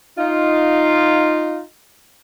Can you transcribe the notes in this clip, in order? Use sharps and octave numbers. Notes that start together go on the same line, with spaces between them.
D#4 F4